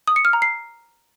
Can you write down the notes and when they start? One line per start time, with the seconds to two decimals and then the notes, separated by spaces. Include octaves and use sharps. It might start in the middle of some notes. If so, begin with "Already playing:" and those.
0.07 D#6
0.16 C#7
0.25 F6
0.33 A#5
0.42 C7